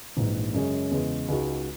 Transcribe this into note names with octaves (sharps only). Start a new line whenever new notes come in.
A#1 G#2 E3
F#2 C#3 G#3 C#4 G#4
E2 C#3 G#3
C#2 C#3 G#3 D#4 F#4